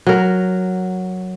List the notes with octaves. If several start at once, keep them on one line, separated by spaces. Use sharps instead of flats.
F#3 A#4